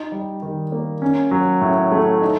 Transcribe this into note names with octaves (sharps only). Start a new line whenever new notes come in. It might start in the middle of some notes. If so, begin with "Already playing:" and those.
Already playing: D#4
G3
D#3
A#3
C#4
F#3
A2
A3
D#4